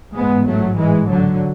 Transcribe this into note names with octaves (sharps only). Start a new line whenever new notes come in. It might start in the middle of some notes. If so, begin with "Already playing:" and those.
A1 G#2 G#3 B3
F#3 A3
E3 G#3
D3 F#3